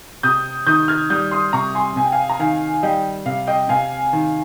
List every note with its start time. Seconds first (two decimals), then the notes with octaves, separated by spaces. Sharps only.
0.23 C3 D#6 G6
0.67 D#3 D#6 G6
0.88 F6 G#6
1.10 G3 D#6 G6
1.31 C6 D#6
1.53 C3 A#5 C#6
1.75 G#5 C6
1.96 C3 G#5
2.04 G5
2.12 F5 G#5
2.29 A#5
2.40 D#3 F5 G#5
2.83 G3 D#5 G5
3.26 C3 F5
3.47 D#5 G5
3.69 C3 F5 G#5
4.13 D#3